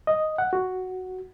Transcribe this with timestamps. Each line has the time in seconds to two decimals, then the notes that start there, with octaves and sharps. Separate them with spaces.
0.07 D#5
0.38 F#5
0.53 F#4